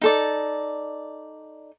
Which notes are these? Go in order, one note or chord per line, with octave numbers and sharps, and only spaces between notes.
D#4 A4 D5